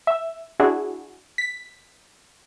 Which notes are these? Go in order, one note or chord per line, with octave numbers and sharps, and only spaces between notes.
E5
D4 E4 F#4 G#4
B6